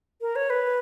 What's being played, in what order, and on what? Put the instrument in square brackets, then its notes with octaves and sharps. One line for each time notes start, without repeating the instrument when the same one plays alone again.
[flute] A#4
C#5
B4